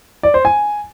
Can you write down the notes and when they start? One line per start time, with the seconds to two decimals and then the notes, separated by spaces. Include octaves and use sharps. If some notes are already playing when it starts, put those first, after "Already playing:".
0.23 D5
0.34 C5
0.45 G#5